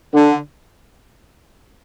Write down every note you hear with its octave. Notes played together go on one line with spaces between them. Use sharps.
D3